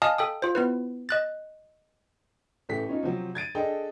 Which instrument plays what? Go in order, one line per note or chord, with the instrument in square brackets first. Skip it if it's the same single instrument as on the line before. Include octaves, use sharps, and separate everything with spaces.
[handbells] D#5 F5 G#5 A5 D#6 F6
A4 G5 D#6
F4 C5
B3 E4 B4
D#5 F#6 A6
[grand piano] A1 E3 A3 G4 B6
C#4 D#4 F4
C3 F3 F#3 C4
G#6 A6 D7 D#7
D4 G#4 A4 D#5 G5